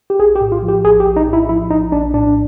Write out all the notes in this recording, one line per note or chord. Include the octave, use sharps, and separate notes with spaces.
G4
A#1 G#4
G4
A2
F4
F3
G4
A#1 G#4
G4
A#1
D#4
A2
E4
F3 E4
A#1 D#4
A#1 D4
A2 D4